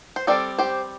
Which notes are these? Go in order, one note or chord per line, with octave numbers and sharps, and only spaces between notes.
C5
G3 C4 A4 D5
G4 C5